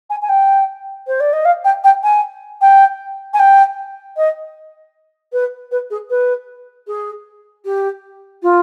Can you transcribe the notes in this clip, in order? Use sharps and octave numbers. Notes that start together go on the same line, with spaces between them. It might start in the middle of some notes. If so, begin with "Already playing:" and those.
G#5
G#5
G5
C5
D5
D#5
F5
G5
G5
G#5
G5
G#5
G5
D#5
B4
B4
G#4
B4
G#4
G4
F4